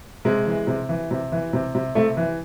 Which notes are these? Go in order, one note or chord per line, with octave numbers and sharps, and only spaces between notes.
C3 G#3
E3
C3
E3
C3
E3
C3
C3
C3 A3
E3